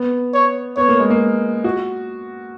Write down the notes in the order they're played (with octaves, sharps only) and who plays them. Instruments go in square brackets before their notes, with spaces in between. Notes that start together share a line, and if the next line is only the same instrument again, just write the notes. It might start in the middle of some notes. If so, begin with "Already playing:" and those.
Already playing: [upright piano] B3
[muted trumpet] C#5
[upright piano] B3 [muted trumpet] C#5
[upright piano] A#3
G#3
A#3
F#4